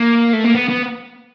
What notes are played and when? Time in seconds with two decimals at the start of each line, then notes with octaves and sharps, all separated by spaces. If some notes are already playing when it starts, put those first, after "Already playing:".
Already playing: A#3
0.33 A3
0.44 A#3
0.55 B3
0.69 B3